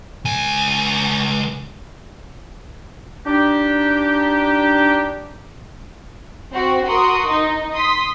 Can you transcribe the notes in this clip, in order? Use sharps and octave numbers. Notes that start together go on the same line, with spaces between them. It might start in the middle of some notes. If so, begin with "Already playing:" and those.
C#2 G#5
D4 D#4 G4
C4 F#4
F#4 A#4 C6 D#6
D#4
C6 D#6 B6